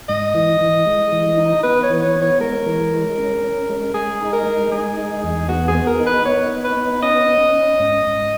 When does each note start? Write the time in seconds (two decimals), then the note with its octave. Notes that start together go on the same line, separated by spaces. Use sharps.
0.09 G#2 D#5
0.35 E3
0.61 E3
0.87 G#3
1.12 E3
1.37 D#4
1.63 B3 B4
1.83 C#5
1.90 E3
2.02 C#5
2.15 B3
2.22 C#5
2.40 G#3 A#4
2.66 E3
2.93 G#3
3.18 C#4
3.44 C#4
3.70 G#3
3.94 G#3 G#4
4.21 D#4
4.33 A#4
4.47 G#3
4.72 G#3 G#4
4.97 D#4
5.24 E2
5.49 B3 F#4
5.68 G#4
5.75 B3
5.87 A#4
6.00 D#4
6.06 B4
6.25 B3 C#5
6.52 D#4
6.64 B4
6.77 B3
7.02 C#4 D#5
7.28 C#4
7.55 C#4
7.80 G#2
8.06 G#2